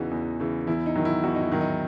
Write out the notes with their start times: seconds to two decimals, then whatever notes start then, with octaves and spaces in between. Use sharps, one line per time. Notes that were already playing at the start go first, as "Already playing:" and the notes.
Already playing: E2 C#3 E3 D#4 F#4
0.11 E2
0.40 C#3 E3
0.67 E2 E4
0.86 D#4
0.95 D#3 F#3
1.05 E4
1.23 E2 D#4 F#4
1.35 D#4
1.42 E4
1.52 D#3 F#3
1.61 D#4